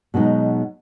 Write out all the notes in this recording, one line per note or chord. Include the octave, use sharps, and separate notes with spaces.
B2 F#3 G#3 D#4